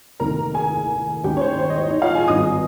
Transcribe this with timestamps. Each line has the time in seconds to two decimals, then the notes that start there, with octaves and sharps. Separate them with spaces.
0.20 F1 D#2 D#3 A#4 A#5
0.54 G#4 G#5
1.23 D#2 D#3 G#3 C#4 G4 G5
1.37 C#5
1.41 C5
1.54 C#5
1.59 C5
1.70 D#5
1.76 C#5
1.88 D#4 D#5
2.02 F4 F5
2.15 G#4 G#5
2.27 G#1 G2 D#3 D#5 D#6